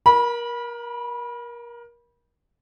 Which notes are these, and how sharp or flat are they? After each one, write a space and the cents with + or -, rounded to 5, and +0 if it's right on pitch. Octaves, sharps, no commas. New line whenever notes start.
A#4 +25 B5 -25